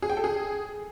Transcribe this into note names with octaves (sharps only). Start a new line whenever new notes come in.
G#4
G5
A4
G#4